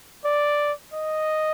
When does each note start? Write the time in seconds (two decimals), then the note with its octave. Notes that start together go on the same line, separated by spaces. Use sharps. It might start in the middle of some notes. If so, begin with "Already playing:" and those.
0.25 D5
0.93 D#5